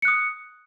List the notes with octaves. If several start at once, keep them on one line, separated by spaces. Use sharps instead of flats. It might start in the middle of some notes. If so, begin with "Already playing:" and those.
D#6 F#6 C#7